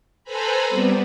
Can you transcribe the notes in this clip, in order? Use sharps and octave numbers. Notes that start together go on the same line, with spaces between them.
A4 B4 C5 G#5 A#5 B5
G3 B3 C4